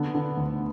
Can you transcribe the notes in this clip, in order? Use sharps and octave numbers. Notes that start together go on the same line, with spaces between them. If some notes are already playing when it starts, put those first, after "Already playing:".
Already playing: D3 B3
D3
D2